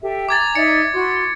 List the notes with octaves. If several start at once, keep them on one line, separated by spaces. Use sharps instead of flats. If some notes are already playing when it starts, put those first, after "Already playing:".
G4 A4 E5
G#5 A#5 D6 G#6 A6
D#4 D5 E5 C#7
E4 F#4 C6